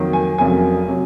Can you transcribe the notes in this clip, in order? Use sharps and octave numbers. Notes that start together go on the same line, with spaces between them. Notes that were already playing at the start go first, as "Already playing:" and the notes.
Already playing: F2 D#3 F#3 A#3
G#5
F1 F2 C#3 F#3 A#3 G#5
C3 F#3